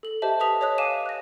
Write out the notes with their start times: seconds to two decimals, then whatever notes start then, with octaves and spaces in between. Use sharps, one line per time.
0.03 A4 F#7
0.22 G4 C5 D#5 E5 A5
0.40 B4 C5 A5 D#6 B6 F7
0.61 C#5 D#5 D#6 F#6
0.78 F5 G#5 D6 D#7 E7
1.06 F#6 A#6